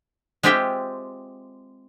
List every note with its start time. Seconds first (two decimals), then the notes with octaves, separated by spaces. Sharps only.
0.43 G#3 C4 F4 G4 E5 G5